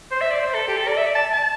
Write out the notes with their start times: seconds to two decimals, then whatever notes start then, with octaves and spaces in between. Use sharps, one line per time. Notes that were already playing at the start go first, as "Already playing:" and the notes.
0.11 C5
0.21 E5
0.30 D5
0.40 C5
0.54 A4
0.68 G4
0.77 A4
0.88 D5
0.97 E5
1.06 D5
1.15 A5
1.33 A5